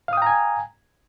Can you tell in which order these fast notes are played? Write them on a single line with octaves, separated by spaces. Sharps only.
F5 D#6 G5 A#5 G#5